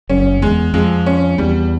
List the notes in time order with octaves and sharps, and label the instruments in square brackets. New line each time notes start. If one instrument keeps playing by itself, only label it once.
[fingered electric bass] F#1 F#2 [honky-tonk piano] C#4
[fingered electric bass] E2 [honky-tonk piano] G#3
[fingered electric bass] F2 [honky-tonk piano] G#3
[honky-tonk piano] C#4
[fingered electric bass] E2 [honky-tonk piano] G3